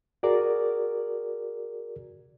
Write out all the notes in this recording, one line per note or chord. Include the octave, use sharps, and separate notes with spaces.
F#4 G#4 A#4 D5